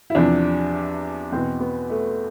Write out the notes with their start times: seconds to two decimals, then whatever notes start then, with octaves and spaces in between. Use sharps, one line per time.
0.10 E4
0.15 E2 C3 F3 D4
1.32 E2 C4
1.36 B2
1.60 B3
1.90 A3